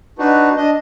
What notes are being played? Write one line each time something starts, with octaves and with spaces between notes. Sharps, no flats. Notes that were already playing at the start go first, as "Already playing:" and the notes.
D4 D#4 F#4 B4
D4 D#5